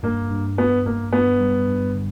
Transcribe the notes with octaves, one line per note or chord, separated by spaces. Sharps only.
G2 A#3
G2
G2 B3
G2 A#3
G2 B3
G3
G2
D3